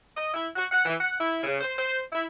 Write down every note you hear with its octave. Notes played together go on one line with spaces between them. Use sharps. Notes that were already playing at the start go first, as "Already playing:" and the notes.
D#5
E4
F#4
F#5
E3
F#5
E4
C#3
C5
C5
E4